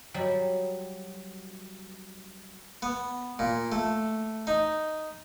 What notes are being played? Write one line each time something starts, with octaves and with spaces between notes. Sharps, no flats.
F#3 G3
B3
A#2
A3
D#4